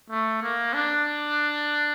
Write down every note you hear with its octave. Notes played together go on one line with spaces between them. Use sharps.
A3
A#3
D4